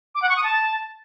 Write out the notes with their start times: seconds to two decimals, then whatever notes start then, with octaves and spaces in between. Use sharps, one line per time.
0.15 D6
0.22 F#5
0.29 C#6
0.37 D#6
0.44 A5